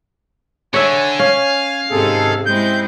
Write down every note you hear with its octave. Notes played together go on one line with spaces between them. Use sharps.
D3 C#5 E5 G#5
C#4 F5
G#2 C3 D#3 G#4 A4
G#3 C4 E4 G6